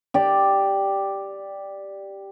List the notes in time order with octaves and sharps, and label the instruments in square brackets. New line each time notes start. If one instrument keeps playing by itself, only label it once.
[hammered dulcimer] G4 D5